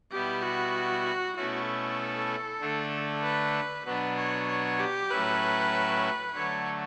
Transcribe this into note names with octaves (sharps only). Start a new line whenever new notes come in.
B2 G3 B3 E4 G4
F#4
B2 A3 C#4 E4 F#4
A4
D3 A3 D4
B4
B2 F#3 B3 D4 B4
C#5
C#5
G4
A2 F#3 C#4 E4 B4
D3 F#3 A3 C#5